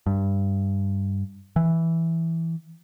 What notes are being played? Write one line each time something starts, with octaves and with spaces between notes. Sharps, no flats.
G2
E3